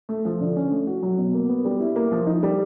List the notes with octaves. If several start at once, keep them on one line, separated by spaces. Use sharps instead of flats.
A3
F3
D3
C#4
A3
F#4
F#3
B2
A#3
B3
G3
E4
A#3
F3
D#4
G3